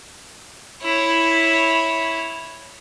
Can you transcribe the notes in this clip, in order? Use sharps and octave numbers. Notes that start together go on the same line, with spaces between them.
E4 C#5